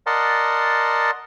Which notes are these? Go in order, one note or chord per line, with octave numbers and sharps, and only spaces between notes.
A#4 D5 D#5 F#5 A5 C6